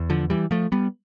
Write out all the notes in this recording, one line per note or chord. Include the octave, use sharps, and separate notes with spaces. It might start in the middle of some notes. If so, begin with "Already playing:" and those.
Already playing: E2
D3 F3
E3 G3
F3 A3
G3 B3